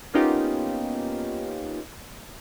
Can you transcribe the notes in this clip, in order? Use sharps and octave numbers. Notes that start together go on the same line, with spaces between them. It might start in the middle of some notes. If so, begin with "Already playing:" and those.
A#3 B3 C#4 D#4 F4 G4